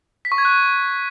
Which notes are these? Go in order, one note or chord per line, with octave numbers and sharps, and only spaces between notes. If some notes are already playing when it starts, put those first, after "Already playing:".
B6
C#6
G#6
F#6